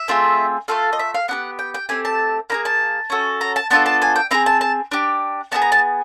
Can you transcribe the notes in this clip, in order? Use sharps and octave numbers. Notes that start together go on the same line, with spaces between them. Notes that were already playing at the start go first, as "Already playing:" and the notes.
Already playing: E5
A3 C4 F4 G#4
A3 C#4 F4 A4 F5
D#5
E5
F5
B3 D4 G4 F#5
G5
G5
A3 C4 G4 G#5
A5
A#3 D#4 G#4 A#5
A5
C#4 F#4 A4
A#5
A5
B3 D4 F4 A4 A5
A5
G#5
G5
C4 E4 G#4 A#5
A5
A5
D4 G4
B3 D#4 G#4 A5
A#5
A5